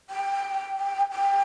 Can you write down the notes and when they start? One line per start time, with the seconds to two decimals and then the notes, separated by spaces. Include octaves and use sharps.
0.10 G5
1.11 G5